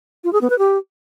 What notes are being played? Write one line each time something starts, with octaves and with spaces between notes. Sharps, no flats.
F4
G#4
B3
B4
G4